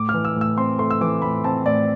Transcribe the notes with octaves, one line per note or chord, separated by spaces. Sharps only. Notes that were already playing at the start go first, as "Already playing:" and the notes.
Already playing: A2 D6
E3 F6
E6
A2
E6
C4 C6
A3 C6
E6
E3 D6
A2 B5
C4 A5
A2 D5